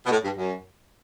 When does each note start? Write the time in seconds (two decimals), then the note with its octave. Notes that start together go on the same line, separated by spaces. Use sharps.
0.06 B2
0.10 A2
0.24 G2
0.36 F#2